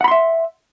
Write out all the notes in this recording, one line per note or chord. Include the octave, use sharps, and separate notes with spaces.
E5 F#5 B5 C6